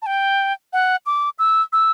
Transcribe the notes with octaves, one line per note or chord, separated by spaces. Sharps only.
A5
G5
F#5
D6
E6
E6